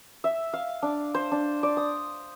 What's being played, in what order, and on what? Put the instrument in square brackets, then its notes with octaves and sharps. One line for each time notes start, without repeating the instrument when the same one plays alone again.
[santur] E5
F5
D4
C5
D4
D5
D#6